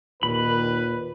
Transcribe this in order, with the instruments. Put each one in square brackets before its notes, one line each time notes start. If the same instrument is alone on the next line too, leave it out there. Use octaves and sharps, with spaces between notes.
[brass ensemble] D#2 B4 [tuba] A#2 [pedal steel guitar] B5